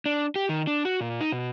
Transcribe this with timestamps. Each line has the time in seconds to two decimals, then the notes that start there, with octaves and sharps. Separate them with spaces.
0.06 D4
0.36 G4
0.49 D#3
0.67 D4
0.85 F#4
1.01 A#2
1.21 D#4
1.32 B2